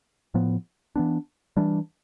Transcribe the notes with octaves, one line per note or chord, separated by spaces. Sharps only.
A2 F3 B3
E3 B3 D4
E3 G3 D4